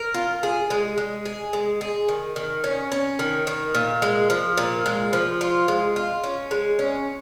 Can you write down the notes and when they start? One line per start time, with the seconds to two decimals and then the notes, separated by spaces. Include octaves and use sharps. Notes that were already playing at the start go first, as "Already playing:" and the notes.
Already playing: A#4
0.14 F4
0.43 G#4
0.70 G#3
0.98 G#3
1.25 G#4
1.53 G#3
1.81 G#4
2.09 D#3
2.36 D#3
2.64 C#4
2.92 C#4
3.19 D#3
3.47 D#3
3.75 A#2
4.02 G#3
4.30 F3
4.57 A#2
4.86 G#3
5.13 F3
5.41 F4
5.68 G#3
5.96 F4
6.24 C#4
6.51 G#3
6.79 C#4